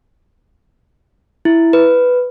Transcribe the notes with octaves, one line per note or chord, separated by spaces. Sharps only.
E4
B4